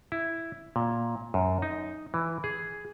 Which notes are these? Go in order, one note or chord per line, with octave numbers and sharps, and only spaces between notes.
E4
A#2
F#2
D#4
E3
G#4